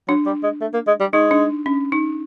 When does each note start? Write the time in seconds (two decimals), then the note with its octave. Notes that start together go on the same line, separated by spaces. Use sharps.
0.08 F#3 D4
0.26 G3
0.43 G#3
0.61 A3
0.74 A#3
0.87 G#3
1.00 G3
1.13 G#3 D#4
1.31 D4
1.66 C#4
1.92 D#4